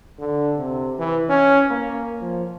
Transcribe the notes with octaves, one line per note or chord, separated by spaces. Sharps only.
D3
C3
E3
C#4
A#3
F3